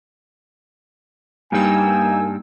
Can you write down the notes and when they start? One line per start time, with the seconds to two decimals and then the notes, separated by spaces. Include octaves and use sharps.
1.52 G2 G3 A#3 D#4 G#5 E6